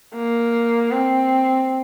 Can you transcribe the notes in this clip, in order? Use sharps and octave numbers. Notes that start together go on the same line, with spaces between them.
A#3
C4